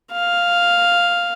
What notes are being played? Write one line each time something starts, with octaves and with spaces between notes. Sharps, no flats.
F5